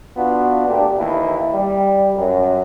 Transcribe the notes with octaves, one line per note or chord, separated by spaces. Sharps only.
B3 D4 F4 F#4
A#2 A3 D4 G4
D#2 E3 E4
G3
F#2